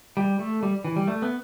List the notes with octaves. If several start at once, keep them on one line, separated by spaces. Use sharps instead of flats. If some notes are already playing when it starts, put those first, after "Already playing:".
G3
A3
G3
E3
G3
A3
B3